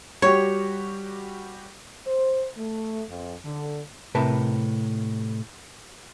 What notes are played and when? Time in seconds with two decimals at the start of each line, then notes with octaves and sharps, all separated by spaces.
0.22 G3 F#4 G4 C#5
2.07 C5
2.57 A3
3.09 F2
3.45 D3
4.15 A2 C3 A#4 B4 A5